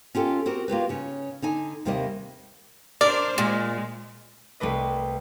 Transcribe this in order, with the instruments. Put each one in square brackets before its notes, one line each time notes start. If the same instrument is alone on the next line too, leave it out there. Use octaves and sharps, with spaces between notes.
[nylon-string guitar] C#4 F4 G4 A4
C4 F#4 G4 A#4
A#3 F4 G4 B4
C#3 C#4
D3 D#4 G#5
D#2 C3 G3 A#3 A#4 D#5
[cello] D4 C5 [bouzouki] A#4 [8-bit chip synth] D5
[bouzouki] A#2 [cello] G#3
[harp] C2 G3 A3 B4 D#5